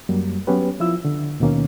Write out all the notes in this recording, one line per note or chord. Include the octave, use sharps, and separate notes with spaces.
F#2 F#3 G3 A#3
F#3 B3 C#4 G4 B4
F3 E4 F4 E6
D3
D#2 B2 D#3 A#3 C#4